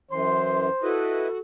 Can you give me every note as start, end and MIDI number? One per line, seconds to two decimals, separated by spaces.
0.11 0.69 42
0.11 0.69 52
0.11 0.93 72
0.11 0.63 84
0.83 1.28 64
0.83 1.39 66
0.83 1.40 69
0.83 1.28 71
0.83 1.28 75